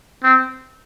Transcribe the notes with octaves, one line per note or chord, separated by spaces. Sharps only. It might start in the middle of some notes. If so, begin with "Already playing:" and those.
C4